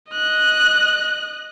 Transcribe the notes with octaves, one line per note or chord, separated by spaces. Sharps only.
D#5 F#6